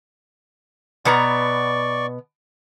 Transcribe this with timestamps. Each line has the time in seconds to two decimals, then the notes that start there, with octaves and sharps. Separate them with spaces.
1.05 B2 B3 D5 A#5 C#6